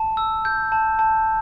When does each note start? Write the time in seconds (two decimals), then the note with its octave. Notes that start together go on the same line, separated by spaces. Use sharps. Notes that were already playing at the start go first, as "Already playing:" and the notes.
Already playing: A5
0.17 E6
0.45 G6
0.72 A5
0.99 A5